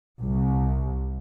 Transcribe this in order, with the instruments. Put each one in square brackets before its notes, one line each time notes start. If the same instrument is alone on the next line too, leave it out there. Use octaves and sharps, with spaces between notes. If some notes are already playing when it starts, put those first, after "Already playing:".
[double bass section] C2